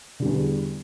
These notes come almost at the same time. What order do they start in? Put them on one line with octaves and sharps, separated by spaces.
D3 G3 E2